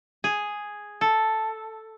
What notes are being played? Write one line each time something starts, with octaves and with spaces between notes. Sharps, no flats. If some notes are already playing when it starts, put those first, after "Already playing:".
G#4
A4